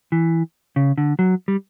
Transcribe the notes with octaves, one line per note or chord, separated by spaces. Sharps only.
E3
C#3
D3
F#3
G3